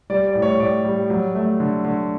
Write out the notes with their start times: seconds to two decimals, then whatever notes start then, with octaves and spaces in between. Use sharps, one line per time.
0.10 G3 D5
0.27 D5
0.35 A2
0.42 C#5
0.60 A2 D5
0.85 G3
1.10 F#3
1.35 A3
1.60 D3
1.84 D3